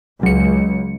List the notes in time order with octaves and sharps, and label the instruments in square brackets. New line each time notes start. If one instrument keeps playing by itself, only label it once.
[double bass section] C#2 [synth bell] F#3 C#7